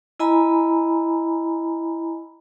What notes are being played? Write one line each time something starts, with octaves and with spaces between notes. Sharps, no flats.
E4 D#5 G#5 A#5 B5